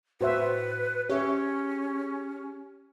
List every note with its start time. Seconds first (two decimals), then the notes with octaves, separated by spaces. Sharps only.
0.21 A2 F#4 B4 C5 E5
1.10 C#4 G4 G#4 C#5 E5 C#7